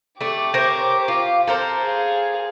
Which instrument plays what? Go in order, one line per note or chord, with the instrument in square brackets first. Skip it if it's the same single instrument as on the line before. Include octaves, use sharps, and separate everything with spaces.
[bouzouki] A3 D5 [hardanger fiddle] G4 D6
[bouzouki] A#4 C5 C#5
F4
A4 A#4 C5
[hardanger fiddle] G#4 F5